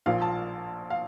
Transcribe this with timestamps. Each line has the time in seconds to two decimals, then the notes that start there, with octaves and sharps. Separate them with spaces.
0.06 A#1 A#2 F3 F5
0.22 A5
0.90 F5